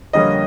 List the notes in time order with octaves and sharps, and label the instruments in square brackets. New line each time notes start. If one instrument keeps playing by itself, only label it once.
[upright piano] F2 D3 G3 A#3 C#4 D#5